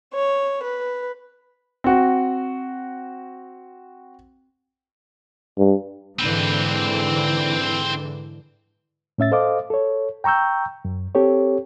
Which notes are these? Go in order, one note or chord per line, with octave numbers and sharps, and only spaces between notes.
C#5
B4
C4 F#4
G2
G#2 D3 E3 C4 B4
A2 C#4 E5 A6
A4 C5 D#5 F5 D6
A4 C#5
G5 A#5 C#6 E6 G6
F#2
C4 G4 A4 C#5